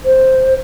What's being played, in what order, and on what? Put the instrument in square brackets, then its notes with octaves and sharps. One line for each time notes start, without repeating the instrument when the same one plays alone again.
[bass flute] C5